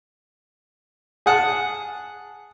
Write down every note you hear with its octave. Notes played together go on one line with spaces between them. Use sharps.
G#4 F#5 A5